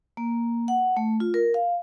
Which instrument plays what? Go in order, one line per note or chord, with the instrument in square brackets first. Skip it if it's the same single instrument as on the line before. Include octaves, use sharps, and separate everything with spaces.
[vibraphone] A#3
F#5
A3
F4
A#4
F5